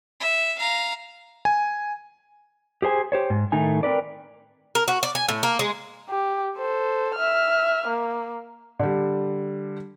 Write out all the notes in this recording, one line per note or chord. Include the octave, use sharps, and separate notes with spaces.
E5
F5 A#5
G#5
G4 G#4 C5 G#5
G4 C5 C#5
G#2
A2 D#3 A3 D#4 G#5
C4 A#4 B4 D5
A#4
F#4
D5
G#5
A2
A#3
G#3
G4
A4 C5
E5 F6
A#3
D3 G3